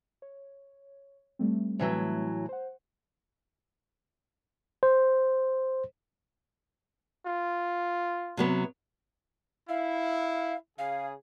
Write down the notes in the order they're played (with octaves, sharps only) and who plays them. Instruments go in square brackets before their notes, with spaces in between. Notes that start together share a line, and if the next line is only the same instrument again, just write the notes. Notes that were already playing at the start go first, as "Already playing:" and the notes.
[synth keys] C#5
G3 A3 C4
[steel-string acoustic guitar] A2 E3 F#3
[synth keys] C5 F#5
[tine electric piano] C5
[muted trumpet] F4
[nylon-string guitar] C3 F#3 B3
[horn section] E4 [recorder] F5
[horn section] C#3 G#4 [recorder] F5